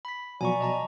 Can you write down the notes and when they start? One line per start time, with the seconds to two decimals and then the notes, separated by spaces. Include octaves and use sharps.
0.05 B5 B6
0.41 B2 F3 F#3 D5 G#5 A#5 C#6
0.61 D#5 A5 A#5